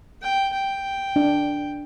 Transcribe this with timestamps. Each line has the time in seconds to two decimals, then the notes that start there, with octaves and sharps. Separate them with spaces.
0.22 G5
0.53 G5
1.16 D4